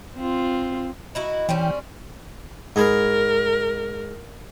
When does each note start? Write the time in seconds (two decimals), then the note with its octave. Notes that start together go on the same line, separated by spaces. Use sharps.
0.16 C4 F4
1.15 D#4 E4 F#4
1.49 E3 G3 C4 C#4 G5
2.76 G#2 G#4 A#4 B5